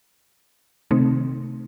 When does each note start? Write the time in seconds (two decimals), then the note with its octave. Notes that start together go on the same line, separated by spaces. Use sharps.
0.91 C3 D#3 A3 C4 D#4